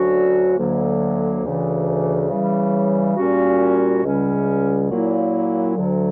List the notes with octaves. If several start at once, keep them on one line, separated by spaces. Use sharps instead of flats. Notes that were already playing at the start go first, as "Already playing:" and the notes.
Already playing: D2 D3 F#3 C#4 F#4
D2 D3 F#3 A#3
D2 C#3 E3
C#3 E3 G3
A#2 G3 C#4 F#4
C#2 C#3 G3 C#4
A#2 F#3 A#3 E4
D2 D3 F#3